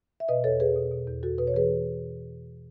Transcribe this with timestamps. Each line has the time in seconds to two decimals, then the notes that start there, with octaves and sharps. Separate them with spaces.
0.20 E5
0.28 B2 B4 D#5
0.44 E2 A4 C#5
0.60 E2 G#4 B4
0.76 B2
0.91 B2
1.07 E2
1.23 E2 F#4 A4
1.38 B2 B4
1.47 C#5
1.54 E3 G#4 B4